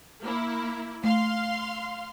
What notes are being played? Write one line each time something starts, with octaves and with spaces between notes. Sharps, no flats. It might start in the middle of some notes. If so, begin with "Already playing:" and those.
A#3 E4
A3 F5 C6 F6